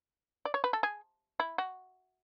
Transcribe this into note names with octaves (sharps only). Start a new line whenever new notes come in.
D5
C#5
B4
A4
G#4
E4
F#4